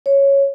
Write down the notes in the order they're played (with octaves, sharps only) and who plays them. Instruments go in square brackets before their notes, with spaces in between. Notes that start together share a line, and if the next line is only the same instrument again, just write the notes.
[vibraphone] C#5